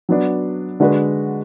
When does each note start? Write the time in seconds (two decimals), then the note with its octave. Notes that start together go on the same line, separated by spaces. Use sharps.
0.09 F#3 B3 D4
0.80 D3 G#3 D4 F#4 B4